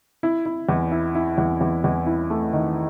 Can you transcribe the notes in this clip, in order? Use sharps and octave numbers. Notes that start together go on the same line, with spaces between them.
E4
E4
E2
E4
E4
E2
E2
E2
E4
A3
D#3